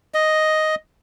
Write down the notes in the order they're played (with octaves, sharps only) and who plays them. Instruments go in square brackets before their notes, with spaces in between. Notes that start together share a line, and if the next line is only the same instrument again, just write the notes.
[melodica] D#5